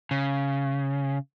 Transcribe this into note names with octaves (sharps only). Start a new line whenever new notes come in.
C#3